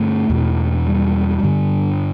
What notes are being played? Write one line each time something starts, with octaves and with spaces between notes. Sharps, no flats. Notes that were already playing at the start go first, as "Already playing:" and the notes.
Already playing: G2 D3 A3
E2 B2
G3
G2 D3